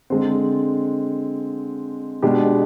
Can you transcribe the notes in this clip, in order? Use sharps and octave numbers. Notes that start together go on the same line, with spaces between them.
D3 G#3 C4
B2 G#3 D4 G4